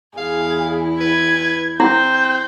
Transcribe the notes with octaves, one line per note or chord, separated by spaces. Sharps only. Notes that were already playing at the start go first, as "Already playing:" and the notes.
E2 E4 G#4 F5
B4 G#6
C4 E4 G6